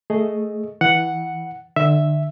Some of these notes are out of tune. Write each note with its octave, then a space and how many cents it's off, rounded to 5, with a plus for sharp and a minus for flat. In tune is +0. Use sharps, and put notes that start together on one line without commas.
A3 +0 G#4 +10 D#5 +0
E3 -15 F#5 +0
D3 +35 E5 +0